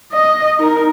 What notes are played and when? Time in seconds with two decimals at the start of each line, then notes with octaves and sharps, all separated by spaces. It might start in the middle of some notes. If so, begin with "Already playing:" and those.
0.12 D#5
0.59 D#4 A#4